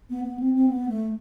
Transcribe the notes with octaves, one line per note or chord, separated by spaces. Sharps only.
B3
B3
C4
C4
B3
A3